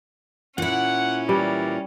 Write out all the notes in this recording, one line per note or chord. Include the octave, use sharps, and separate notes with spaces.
A#2 C#4 E4 F#5
E3 G3 A#4 D5